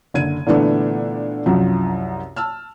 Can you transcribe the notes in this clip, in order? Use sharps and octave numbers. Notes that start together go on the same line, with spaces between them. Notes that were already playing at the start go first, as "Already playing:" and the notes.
F#1 D3 G#6 D#7
A#2 D3 E3 A3 B3 D4
C2 F#2 F3 F#3
A5 E6 F6